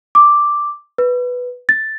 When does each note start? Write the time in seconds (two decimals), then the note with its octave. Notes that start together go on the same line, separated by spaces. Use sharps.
0.15 D6
0.98 B4
1.69 A6